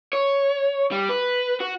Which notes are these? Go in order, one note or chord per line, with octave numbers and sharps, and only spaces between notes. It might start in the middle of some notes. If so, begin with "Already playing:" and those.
C#5
G3
B4
F#4